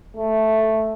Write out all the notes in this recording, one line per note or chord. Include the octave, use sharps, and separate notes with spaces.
A3